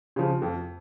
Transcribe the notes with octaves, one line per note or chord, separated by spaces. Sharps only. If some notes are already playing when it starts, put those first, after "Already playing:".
C#3 F3
F2